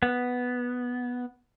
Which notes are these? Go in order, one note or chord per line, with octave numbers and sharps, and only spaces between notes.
B3